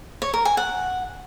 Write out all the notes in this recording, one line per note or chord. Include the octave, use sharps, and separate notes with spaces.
C#5
A#4
G#5
F#5